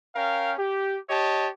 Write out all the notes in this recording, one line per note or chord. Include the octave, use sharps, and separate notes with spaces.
C#4 A#4 F5 G5
G4
G4 C#5 D#5 A5